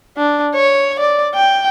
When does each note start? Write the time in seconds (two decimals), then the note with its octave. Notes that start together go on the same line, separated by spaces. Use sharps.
0.17 D4
0.55 C#5
1.00 D5
1.35 G5